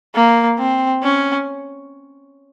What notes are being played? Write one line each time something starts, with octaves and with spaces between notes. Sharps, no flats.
A#3
C4
C#4